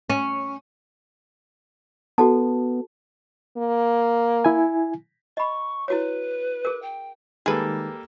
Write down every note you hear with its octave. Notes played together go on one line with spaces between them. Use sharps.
C#4
B3 F#4 A4 A5
A#3
E4 G#5
D#5 B5 C#6
E4 F#4 B4 C#5
G#4 A#4
G5
D#3 G3 G#3 A#3 D#4 G#4 A4 B4